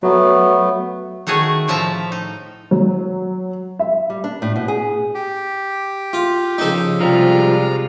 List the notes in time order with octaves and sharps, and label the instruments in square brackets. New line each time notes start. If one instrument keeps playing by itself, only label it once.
[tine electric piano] F#3 [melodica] A3 B3
[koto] D#3 A3 F#4 G#4 C#5
A2 F3 E5 A5 A#5
D#4
[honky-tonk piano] F#3
E5
[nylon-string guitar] G3
D4
A2
B2
G#4
[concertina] G4
[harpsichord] F4
[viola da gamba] C#3 F3 [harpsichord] D#4 A4
[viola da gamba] C3 G#3 F4 [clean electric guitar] F3 G3 [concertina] A#5 F6